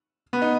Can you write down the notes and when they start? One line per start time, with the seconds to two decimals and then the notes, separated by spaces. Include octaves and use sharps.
0.33 B3
0.42 D#4